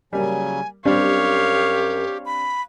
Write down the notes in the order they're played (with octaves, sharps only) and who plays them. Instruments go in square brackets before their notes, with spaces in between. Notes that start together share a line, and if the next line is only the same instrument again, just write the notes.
[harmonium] C#3 F#3 [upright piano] G3 A#3 [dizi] G#5
[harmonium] F#2 [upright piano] G3 C4 D4 [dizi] G4 [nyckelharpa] C#5 F5
[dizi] B5